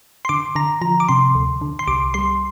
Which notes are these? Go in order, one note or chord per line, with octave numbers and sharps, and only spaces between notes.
C6
D3 D6
D3 A#5
F3 A#5
D6
C3 C6
D2
D3
C6
C2 D6
G3 C6